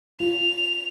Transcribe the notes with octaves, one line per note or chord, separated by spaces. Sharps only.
F4 F7